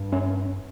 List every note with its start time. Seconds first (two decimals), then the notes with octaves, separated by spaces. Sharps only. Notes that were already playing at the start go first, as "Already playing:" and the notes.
Already playing: G2
0.12 C#4